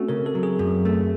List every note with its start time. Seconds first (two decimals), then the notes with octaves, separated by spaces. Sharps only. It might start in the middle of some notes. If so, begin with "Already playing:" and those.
Already playing: A3 C4 C#4 F#4
0.09 C#3 A#4
0.26 A4
0.35 F#3
0.43 G#4
0.59 F#2
0.85 A3